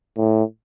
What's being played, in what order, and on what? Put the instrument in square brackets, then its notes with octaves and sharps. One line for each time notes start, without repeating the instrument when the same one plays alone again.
[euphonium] A2